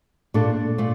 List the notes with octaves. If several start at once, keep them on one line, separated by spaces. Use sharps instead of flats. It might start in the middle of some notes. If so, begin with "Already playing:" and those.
A#2 A3 D4 A4
A#2 A3